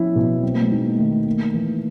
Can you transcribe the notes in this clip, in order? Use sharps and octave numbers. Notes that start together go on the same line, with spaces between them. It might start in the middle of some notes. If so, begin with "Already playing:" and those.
Already playing: F3 C#4 E4
B2
F#3 C4
A#3
A3
G#3 D#4
A#3
D#3 A3
A#3
E3